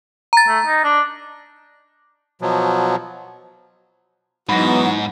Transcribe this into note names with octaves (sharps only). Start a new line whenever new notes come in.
A#5 A6
A3
D#4
D4
B2 F3 F#3
G#2 E3 F#3 B3 D#4 F#4 B5 A#6